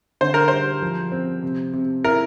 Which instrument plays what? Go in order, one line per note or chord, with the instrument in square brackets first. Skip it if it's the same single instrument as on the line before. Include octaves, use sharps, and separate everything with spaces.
[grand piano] D3 [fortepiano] C5
[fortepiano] A#4
[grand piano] G3 [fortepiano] C5
[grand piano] F3
C4
C3
C3
[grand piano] E4 [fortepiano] A#4